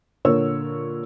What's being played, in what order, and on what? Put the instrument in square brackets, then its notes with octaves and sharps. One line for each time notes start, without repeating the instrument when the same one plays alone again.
[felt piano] A#2 D3 A#4 C#5 E6